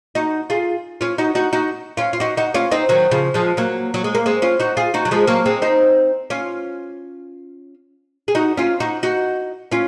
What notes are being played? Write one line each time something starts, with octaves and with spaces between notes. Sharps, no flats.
D#4 F#4
F4 G#4
C#4 F4
D#4 F#4
D#4 F#4
D#4 F#4
C#4 F4
F4
D#4 F#4
D#4 F#4
C#4 F4
C4 D#4
D#3 F#3
C#3 F3
F3 G#3
F#3 A#3
F#3
G#3
A#3
G#3 C4
C#4 F4
D#4 F#4
F4 G#4
D#4 F#4
F#3
F3 G#3
F#3 A#3
G#3 C4
C4 D#4
C#4 F4
G#4
D#4 F#4
C#4 F4
D#4 F#4
D#4 F#4
C#4 F4